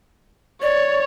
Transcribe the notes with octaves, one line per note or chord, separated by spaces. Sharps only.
C#5 D5